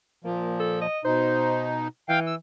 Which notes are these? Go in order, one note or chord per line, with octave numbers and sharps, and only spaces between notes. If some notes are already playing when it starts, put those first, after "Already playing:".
A#2 F3 A#3
A4
D#5
B2 D#4 C5
E3 F5 G5
E6